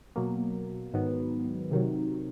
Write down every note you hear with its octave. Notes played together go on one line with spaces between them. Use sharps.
B2 F#3 A#3
G#2 D#3 F#3 B3
C3 D#3 F#3